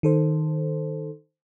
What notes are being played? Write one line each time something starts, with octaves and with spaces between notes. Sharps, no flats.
D#3 A4 C5